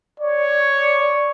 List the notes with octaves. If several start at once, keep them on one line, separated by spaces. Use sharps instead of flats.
C#5 D5